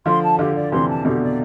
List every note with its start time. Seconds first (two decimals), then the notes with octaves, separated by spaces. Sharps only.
0.06 D3 F3 C6
0.23 A5
0.39 D3 F3 G4
0.56 D5
0.72 C3 E3 C6
0.89 A5
1.05 B2 D3 G4
1.22 D5